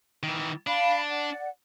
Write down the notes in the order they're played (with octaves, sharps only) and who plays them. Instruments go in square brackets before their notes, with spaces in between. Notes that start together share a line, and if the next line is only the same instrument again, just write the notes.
[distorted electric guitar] D#3 E3
[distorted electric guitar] D4 [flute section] F5 B5
[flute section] D5 F#5